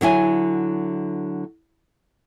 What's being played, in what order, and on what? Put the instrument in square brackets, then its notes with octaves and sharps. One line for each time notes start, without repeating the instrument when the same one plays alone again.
[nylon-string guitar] D3 F#3 E4 G#5